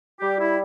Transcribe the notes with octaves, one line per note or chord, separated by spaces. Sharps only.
G3 G4
E4